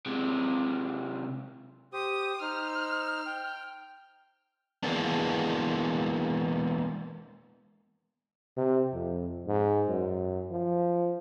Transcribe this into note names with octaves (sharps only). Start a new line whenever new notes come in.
C3 G#3
G4 C5 D#6
D#4 C5 F6
G5
E3 G#3 A#3 B3 D4
C3
F2
G#2
F#2
F3